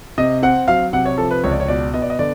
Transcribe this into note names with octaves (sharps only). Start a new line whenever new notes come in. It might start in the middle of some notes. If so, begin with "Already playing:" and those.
C3 D#5
C4 F#5
F#3 F5
C3 F#5
C#5
F3 A4
B4
C#2 C#5
D5
C#5
B2 D5
B3 D#5
D5
D#5
D3 D5